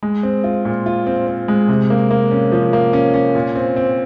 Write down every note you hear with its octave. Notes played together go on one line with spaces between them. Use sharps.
G#3
C4
F4
A#2
F4
C4
C4
G#3
C3
A#3
A#3
C#4
F3
A#3
C#4
C#4
A#2
C4
C4